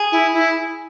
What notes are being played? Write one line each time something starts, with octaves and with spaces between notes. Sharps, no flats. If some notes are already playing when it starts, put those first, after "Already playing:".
Already playing: G#4
E4
E4